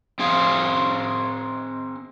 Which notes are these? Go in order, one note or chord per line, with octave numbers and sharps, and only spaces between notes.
C4 G#4 F5